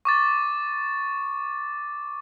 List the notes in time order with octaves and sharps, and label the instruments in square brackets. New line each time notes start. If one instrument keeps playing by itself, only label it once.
[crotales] C#6 D6 A6